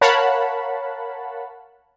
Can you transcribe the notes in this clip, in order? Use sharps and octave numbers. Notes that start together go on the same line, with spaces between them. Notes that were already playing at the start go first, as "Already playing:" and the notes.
A#4 C#5 F5 F#5 A5 B5